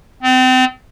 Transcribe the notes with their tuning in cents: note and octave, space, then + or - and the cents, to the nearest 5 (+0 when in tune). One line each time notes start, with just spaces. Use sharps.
C4 -35